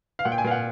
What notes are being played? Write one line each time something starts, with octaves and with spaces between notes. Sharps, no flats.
F5
A#2 F#5
G5
G#5
A#2 F5
F#5